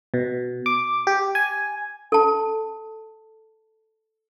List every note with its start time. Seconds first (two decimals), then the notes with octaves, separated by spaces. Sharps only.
0.14 B2
0.66 D6
1.07 G4
1.35 G#5
2.12 A4 A5